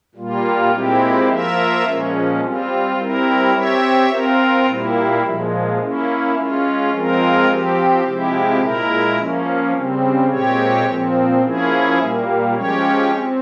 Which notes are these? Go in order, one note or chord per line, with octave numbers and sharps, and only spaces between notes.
A#2 G3 A#3 F4
A#2 G#3 C4 E4 G4
F3 A#3 F4 A#4 E5
A#2 F3 G#3 C#4
G3 C4 F4
G3 C4 E4 A#4
C4 G4 C#5 E5
C4 F4 A#4
A#2 G3 A#3 E4
A#2 F3 G#3
A#3 C#4 E4
G#3 C#4 F4
F3 G#3 C4 F4 A#4
F3 C4 G4
C3 F3 G#3 E4 G4
A#2 G#3 E4 A#4
F3 A#3 C#4
C#3 G3 C4
A#2 G#3 C4 G4 C#5
A#2 F3 C4
F3 A#3 C#4 E4 G#4
A#2 G3 A#3
F3 G#3 C#4 G4 C#5
C4